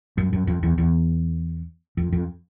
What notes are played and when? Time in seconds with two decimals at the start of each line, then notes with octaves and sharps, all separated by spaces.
0.18 F#2
0.33 F#2
0.47 F2
0.63 E2
0.78 E2
1.97 F2
2.12 F2